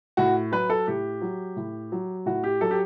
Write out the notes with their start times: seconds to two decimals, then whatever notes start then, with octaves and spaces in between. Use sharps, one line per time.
0.17 A2 F#4
0.52 F#3 B4
0.70 A4
0.87 A2 G4
1.22 F#3
1.56 A2
1.92 F#3
2.26 A2 F#4
2.44 G4
2.61 F#3 A4
2.71 G4